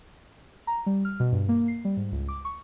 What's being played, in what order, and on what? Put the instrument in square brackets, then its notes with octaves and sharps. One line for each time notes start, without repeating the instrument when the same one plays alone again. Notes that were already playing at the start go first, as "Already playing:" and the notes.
[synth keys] A#5
G3
F6
B2
G2
A#3
C7
G3
G#2
C#2
D6
C#6